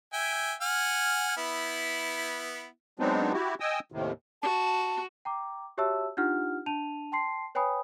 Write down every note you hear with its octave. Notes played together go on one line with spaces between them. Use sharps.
E5 G5 G#5
F#5 G#5 F6
B3 E4
F#3 G#3 B3 C4 D4 D#4
E4 F#4 G4
D#5 G5 G#5 D#6 E6
D#2 A2 C3 D#3
F#4 A5
G5 A#5 D6
F#4 G4 C#5 E5 A5 E6
D4 D#4 F4 G4 F#5 F6
D4 A5 D#7 F7
G5 A5 C6 C7
B4 C#5 G5 G#5 B5 D#6